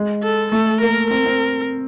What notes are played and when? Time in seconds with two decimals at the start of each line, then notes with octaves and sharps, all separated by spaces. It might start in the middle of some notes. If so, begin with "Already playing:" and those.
Already playing: G#3
0.23 A4
0.52 A3 A4
0.81 A#3 A#4
1.10 C4 A#4
1.26 C4